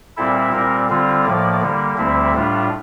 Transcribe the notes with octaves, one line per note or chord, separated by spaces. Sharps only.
A#2 G3 C4 E4 A4
A#2 G3 C4 A#4
D3 G3 C4 F4
A2 F3 A#3 D5
D3 G3 A#3
D2 D3 G3 C4 E4
A2 G3 D4 F4